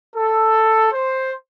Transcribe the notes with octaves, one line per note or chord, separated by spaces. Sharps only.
A4
C5